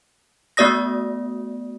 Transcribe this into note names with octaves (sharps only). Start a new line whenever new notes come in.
A3 B3 F#4 D5 D#6 A#6